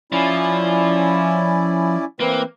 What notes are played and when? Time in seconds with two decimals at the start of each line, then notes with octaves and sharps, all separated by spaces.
0.12 F3 C#4 E4 D5
2.20 E3 A#3 C4 B4